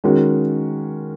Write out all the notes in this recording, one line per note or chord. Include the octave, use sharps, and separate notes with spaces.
D#3 G#3 C#4 F#4